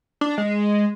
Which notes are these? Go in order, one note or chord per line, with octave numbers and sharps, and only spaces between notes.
D4
G#3